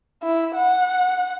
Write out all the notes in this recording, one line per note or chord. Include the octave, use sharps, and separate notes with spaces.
E4
F#5